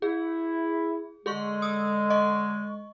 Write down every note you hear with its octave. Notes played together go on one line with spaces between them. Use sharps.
E4 G#4
D3 G#3 G#4 C6 C#6
D#6 E6
D#5 C#6